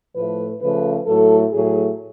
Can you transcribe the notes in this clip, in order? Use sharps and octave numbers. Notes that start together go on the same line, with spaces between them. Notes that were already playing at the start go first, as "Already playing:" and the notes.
A2 F3 A3 B4
C#3 F3 A3 B4
A2 F#3 A3 A4
A2 F#3 A3 G#4